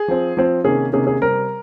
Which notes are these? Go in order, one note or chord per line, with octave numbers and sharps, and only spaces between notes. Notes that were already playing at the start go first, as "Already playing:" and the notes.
Already playing: G#4
F3 C4
F3 C4
C3 D#3 A#3 C#4 G#4
C3 D#3 A#3 C#4 G#4
G#4
C3 G3 C4 A#4